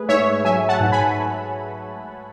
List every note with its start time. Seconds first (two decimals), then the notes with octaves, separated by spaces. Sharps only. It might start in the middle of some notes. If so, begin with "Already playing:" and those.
Already playing: A3 G#4 B4
0.09 G#2 C#5 E5
0.45 F#3 E5 G#5
0.69 F#5 A5
0.80 G#2
0.92 G#5 B5